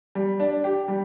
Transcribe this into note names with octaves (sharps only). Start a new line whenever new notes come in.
G3
D4
G4
G3